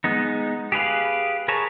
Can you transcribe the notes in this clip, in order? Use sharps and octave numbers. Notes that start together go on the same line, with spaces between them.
G#3 B3 D#4
G4 G#4 B4 F5
G#4 A#4 B4 C#5 A5